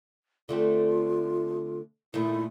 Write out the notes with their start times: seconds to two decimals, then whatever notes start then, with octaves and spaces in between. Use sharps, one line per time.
0.49 D3 A3 C4 F4
2.14 A#2 D#3 A3 E4